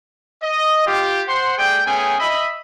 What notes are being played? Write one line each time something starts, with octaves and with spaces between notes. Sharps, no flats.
D#5
F4 G4
C5 F#5 C6
A3 G#4 D5 G5
A3 B3 C#4 G#4 G5 G#5
D#5 E5 B5